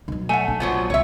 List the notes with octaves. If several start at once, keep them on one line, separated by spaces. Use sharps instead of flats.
B2 F#3
A3 F#5 G#5
A#1
B2 F3 F#3
C2 C#5 E5